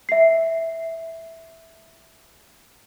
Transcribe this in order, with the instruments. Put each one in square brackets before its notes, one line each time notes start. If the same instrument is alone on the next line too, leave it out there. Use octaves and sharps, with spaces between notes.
[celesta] E5 C7